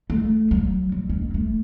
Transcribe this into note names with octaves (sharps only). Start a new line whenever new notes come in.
A3
F#3
F#3
C#4
B3
A3